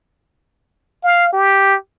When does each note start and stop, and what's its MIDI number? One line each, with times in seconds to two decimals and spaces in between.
1.03 1.31 77
1.33 1.76 67